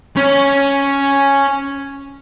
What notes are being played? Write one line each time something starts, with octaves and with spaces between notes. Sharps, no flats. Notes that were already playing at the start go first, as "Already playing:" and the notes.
C#4 C#5